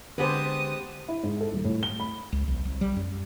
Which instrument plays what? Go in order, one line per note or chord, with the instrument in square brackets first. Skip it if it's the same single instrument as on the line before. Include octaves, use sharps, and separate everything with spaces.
[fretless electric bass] D3 [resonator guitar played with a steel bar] G#3 B3 G4 [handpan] B4 C5 [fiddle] A5 D#6
[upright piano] E4
G#2
A4
D#1
A2
G7
B5
[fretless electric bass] C#2
B1
C2
G3
F#2